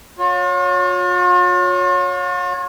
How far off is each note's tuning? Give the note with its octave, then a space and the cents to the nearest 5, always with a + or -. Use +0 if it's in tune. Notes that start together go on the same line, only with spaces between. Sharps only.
F4 +45 C#5 +0